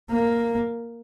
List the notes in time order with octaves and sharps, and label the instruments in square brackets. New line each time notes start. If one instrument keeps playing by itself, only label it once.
[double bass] A#3